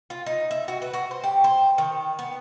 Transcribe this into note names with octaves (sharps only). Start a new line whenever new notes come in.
F4
D#4
E5
F#4
B4
F#4
C5
G4
C5
D#3
B3